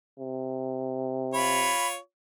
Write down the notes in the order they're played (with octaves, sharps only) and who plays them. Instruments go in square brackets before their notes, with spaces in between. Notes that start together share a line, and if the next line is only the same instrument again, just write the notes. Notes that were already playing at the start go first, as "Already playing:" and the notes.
[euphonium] C3
[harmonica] F4 C#5 [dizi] B5